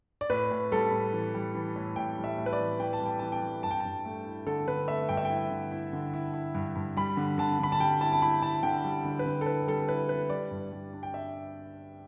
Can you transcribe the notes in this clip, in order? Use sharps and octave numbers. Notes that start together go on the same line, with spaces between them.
D5
A2 B4
A2
G3 A4
A2
E3
G3
E3
A2
A2 G5
G3
E5
A2
B4
D5
E3
E3 G5
A5
G3
G5
E3 A5
G5
G3
G2 A5
G5
G2 A5
A3
E4
D3 A4
D3 B4
A3 E5
G2 G5
E5
G5
E4
D3
E4
D3
E4
E4
G2
G2
G3 B5
D3
D3 A5
D3 B5
A5
G3 G5
E4 A5
A5
E4 B5
E4 A5
D3 G5
G3
D3
B4
D3
A4
E4 B4
G3 A4
E4 B4
E4 B4
G3 D5
G2
G3
D4
G5
E5